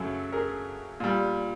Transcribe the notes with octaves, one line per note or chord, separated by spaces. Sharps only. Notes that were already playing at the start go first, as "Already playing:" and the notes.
Already playing: F#2 C#3 F#3 A3 A4
G#4 A#4
A#2 G3